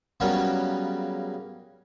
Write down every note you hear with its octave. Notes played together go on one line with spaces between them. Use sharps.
C#3 F#3 G3 A#3 B3 C#4